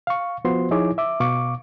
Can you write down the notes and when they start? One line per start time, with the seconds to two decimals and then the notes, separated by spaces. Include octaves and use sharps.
0.07 F5 C#6
0.45 F3 B3 F4 F#4 C5 C6
0.71 F3 D#4 E4 G#4 C#5 D6
0.98 E5 D6
1.20 B2 F5 C#6 D6